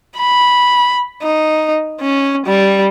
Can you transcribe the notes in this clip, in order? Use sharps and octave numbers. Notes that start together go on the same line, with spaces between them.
B5
D#4
C#4
G3